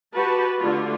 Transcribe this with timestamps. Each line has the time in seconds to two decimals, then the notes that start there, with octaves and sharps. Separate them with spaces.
0.14 F#4 G4 B4 A5
0.61 D3 A3 F4